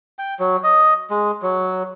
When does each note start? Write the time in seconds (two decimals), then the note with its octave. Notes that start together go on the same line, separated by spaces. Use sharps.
0.19 G5
0.40 F#3
0.64 D#5
1.10 G#3
1.42 F#3